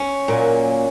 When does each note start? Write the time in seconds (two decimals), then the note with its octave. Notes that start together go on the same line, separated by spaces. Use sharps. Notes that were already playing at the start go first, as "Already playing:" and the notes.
Already playing: C#4
0.28 A#2 F#3 A#3